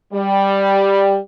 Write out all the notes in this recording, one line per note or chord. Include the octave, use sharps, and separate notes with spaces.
G3